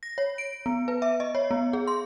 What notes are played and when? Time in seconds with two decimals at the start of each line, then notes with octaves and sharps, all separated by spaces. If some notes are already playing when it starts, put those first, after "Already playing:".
0.03 A#6
0.18 C#5
0.38 D7
0.66 B3
0.88 B4
1.02 E5
1.20 D#5
1.35 C#5
1.51 B3
1.73 G#4
1.87 C6